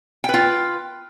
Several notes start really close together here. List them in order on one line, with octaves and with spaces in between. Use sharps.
G5 B4 F4